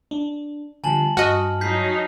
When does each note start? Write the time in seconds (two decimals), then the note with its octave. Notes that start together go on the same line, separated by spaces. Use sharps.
0.11 D4
0.84 D3 F3 G3 G#5 A5 F#7
1.17 G2 F#4 D#5 F6
1.61 F#3 D#4 G6 B6 C7